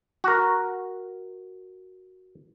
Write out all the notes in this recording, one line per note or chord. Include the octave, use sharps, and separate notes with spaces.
F#4 A#4